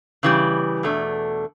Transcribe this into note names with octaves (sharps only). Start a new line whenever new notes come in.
C#3 E3 G3
E2 B2 A3 D4